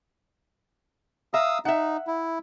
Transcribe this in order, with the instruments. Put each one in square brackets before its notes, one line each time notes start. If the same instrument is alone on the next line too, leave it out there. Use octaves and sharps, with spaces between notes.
[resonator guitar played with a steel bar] E5 A#5 [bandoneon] F5 D#6 E6
[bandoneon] D#4 [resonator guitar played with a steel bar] E5 F#5
[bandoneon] E4